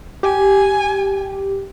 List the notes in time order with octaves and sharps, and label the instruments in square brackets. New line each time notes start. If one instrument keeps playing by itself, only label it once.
[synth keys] G4 [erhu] G#5